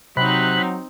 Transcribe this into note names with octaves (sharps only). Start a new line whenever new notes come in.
C3 F#3 C4 D#4 B5 F#6